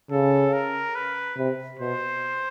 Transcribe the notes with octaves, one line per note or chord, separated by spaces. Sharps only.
C#3 A4
A#4
B4
C3
B2 C5